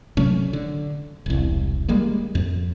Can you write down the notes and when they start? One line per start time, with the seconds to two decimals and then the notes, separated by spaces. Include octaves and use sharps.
0.17 C3 F#3 A3 C#4
0.53 D3
1.26 E1 C2
1.88 G3 G#3 A#3
2.35 F2